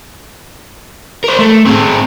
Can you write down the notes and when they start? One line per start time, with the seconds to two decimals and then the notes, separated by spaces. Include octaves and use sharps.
1.24 A#4 C5
1.39 A3
1.66 C4 G#4